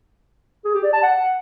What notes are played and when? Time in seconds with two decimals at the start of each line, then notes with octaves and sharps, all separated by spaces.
0.65 G#4
0.74 G4
0.84 D5
0.93 A5
1.03 F#5